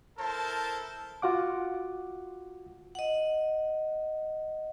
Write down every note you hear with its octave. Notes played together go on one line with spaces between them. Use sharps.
E4 A4 A#4 C5 A5
F4 F#4 F#5 D6
D#5 F#5